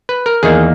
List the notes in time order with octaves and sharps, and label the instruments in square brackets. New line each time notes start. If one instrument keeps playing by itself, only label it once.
[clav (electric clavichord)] B4
A#4
E2 D#3 A#3 D#4 G#4